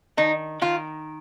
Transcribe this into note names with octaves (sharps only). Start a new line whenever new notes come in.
D#3 D#4
D#3 F4